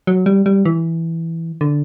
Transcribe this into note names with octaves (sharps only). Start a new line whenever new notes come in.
F#3
G3
G3
E3
D3